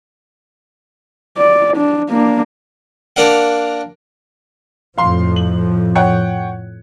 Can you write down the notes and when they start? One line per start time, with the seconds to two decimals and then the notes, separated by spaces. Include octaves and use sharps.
1.38 D5
1.77 D4
2.10 A#3 D4
3.16 A#3 D4 F5 F#5
4.98 F2 A2 F3 F5 C6
5.36 F#7
5.95 C#5 F#5 G5